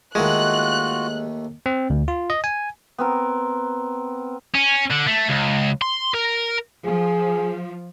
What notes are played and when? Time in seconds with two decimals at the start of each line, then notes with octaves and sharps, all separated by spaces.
0.15 D#2 D#3 G#3 A3 F4 F#4 F#6
1.66 C4
1.90 D2
2.08 F4
2.30 D#5
2.44 G#5
2.98 B3 C4 A#4
4.54 C#4
4.90 D3
5.07 A3
5.29 C#2
5.82 C6
6.14 A#4
6.85 F3 G#4